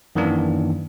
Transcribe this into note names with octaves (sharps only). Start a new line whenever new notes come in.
F#2 D#3 E3 A#3 D4